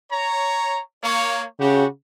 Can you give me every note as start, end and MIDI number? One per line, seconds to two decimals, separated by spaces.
0.11 0.80 73
0.11 0.80 82
1.02 1.44 58
1.02 1.44 73
1.59 1.84 49
1.59 1.86 66
1.59 1.86 67